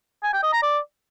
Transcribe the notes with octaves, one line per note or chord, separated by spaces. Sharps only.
G#5
G5
D#5
A#5
D5